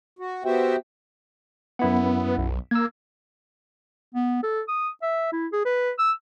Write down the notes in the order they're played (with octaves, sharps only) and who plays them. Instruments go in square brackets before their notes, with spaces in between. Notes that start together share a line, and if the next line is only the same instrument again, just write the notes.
[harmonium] F#4
B3 F#4 G4 C5 E5 G5
[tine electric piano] F#2 E4 F#5 [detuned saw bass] B3
[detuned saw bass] B1
[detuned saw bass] A#3 [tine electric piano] E6 G#6
[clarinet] B3
A4
D#6
E5
E4
G#4
B4
E6